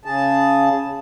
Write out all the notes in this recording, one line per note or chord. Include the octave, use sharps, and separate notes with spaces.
C#3 G#4 A5